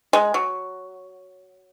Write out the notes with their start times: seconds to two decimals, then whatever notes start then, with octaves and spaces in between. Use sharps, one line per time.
0.13 G#3
0.34 F#3